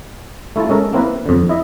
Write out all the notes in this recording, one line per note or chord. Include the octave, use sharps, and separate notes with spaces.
A3 E4 F4 A5
G#3 C#4 A4 A#4
A#3 C4 E4 A#4 B4
F2 D3
E4 D#5 E5